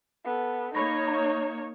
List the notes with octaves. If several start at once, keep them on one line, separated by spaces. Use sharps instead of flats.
B3 A4
A#3 D#4 C#5 B5 A#6
A#5